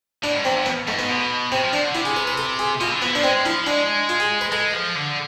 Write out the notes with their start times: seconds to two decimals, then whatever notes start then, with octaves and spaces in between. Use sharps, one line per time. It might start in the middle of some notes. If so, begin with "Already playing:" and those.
0.23 A2 D4
0.34 G#2
0.45 E2 C4
0.55 F2
0.66 B3
0.88 G#2 A3
0.99 B3
1.09 B2
1.52 C3 C4
1.62 F3
1.73 F3 D4
1.84 D3
1.95 C3 E4
2.05 G#4
2.16 B4
2.27 B4
2.38 A4
2.59 G#4
2.81 B2 F4
2.91 D3
3.02 E3 B3
3.13 F3 D4
3.23 G#3 C4
3.45 F3 E4
3.66 G#3 D4
4.09 F4
4.20 G#4
4.41 B4
4.52 G#3 A4
4.74 F3
4.95 D3